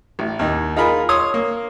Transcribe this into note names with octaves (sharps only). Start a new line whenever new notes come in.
A1
D#2 D#4
D#4 F4 G#4 A#4 B5
C#5 C6 D#6
A#3